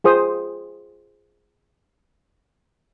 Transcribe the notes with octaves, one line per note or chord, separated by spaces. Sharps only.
F4 G#4 C5 D#6